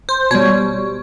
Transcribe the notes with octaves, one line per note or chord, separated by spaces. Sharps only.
C5
B2 G3 C#5